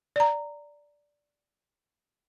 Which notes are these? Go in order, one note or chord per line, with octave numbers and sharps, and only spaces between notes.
D5 A#5